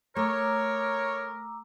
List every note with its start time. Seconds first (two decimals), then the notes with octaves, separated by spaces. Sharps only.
0.16 A3 A#4 C#5 A#5 D6 E6